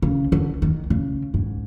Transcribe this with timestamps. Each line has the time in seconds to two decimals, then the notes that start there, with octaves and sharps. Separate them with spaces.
0.02 C#3
0.32 D3
0.62 D#3
0.90 C#3
1.34 G#2